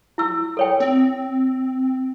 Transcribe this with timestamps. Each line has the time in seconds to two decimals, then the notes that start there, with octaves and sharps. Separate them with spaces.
0.18 E4 E6
0.57 A4 C#5 G5
0.80 C4